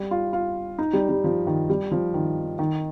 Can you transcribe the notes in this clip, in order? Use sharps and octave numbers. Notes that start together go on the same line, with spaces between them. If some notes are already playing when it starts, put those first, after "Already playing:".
Already playing: G3
F4
F4
D#4
G3
G3
F3
D#3
G3
F3
D#3
D#3